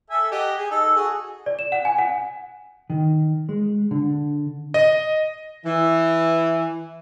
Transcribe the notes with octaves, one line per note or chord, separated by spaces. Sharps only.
A4 E5 G#5
G4 D#5 F#5
G#4
D#4 A4
F#4 G#4
D5
E7
F#5
G#5
F#5
D#3
G#3
D3
D#5
E3